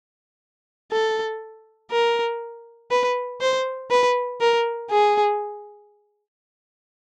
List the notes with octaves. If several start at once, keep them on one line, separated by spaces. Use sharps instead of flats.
A4
A#4
B4
C5
B4
A#4
G#4